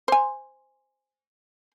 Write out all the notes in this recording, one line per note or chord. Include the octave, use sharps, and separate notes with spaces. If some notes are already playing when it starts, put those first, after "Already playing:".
C5 G#5